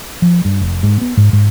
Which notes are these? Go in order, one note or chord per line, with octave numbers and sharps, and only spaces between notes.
F3
G2
F1
G#2
B3
G#2
G#2